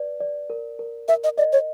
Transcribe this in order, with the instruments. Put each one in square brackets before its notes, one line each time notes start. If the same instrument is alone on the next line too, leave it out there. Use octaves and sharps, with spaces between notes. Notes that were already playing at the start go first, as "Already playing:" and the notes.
Already playing: [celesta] B4 D5
D5
A#4
A#4
[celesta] A#4 [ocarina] E5
[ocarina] D#5
[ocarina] D5 [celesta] D#5
[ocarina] C#5